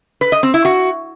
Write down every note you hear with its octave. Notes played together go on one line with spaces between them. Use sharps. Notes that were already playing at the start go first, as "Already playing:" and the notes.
B4
D#5
C4
E4
F#4